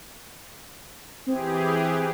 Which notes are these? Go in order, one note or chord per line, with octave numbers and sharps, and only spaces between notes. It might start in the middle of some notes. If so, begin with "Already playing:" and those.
E3 C4 G4 G#4